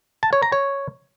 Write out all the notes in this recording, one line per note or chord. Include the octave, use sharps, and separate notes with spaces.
A5
C#5
A#5
C#5